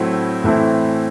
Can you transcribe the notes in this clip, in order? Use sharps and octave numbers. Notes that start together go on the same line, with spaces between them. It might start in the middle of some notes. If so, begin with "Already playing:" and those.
Already playing: A2 F#3 A3 C4 E4
A2 E3 A3 C4 E4